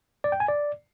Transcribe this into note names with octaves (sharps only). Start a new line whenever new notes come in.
D5
G5
G#5
D5